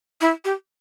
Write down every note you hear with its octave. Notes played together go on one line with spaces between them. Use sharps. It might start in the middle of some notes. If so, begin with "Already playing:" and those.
E4
G4